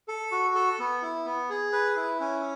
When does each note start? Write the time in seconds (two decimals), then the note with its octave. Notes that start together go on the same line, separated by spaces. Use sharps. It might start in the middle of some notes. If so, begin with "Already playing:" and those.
0.08 A4
0.32 F#4
0.55 A4
0.79 B3
1.02 E4
1.26 B3
1.49 G#4
1.72 B4
1.96 E4
2.20 C#4